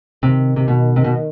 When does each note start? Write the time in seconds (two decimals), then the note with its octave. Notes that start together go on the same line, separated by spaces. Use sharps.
0.23 C3 D#3
0.56 C3
0.68 B2
0.96 C3
1.05 B2